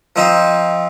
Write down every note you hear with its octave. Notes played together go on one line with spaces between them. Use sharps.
F3 C4 D#4